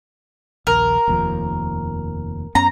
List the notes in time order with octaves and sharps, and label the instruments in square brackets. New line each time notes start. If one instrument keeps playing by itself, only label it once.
[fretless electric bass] A#1 D#2 [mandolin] A#4
[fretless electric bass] F1 D#2 F3
[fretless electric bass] F#2 B3 C#4 [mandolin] A#5